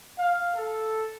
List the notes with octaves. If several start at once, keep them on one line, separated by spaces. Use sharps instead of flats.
F5
A4